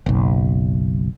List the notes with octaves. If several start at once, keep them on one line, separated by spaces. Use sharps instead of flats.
F#1 B1